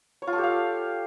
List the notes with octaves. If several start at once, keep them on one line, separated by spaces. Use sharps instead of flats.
C#5
F4
A4
G4
F5